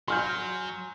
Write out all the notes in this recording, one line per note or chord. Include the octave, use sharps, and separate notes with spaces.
F#3 G#5 C6 F6 G6